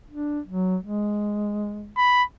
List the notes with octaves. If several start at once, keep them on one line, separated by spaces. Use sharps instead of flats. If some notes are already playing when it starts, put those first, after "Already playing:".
D4
F#3
G#3
B5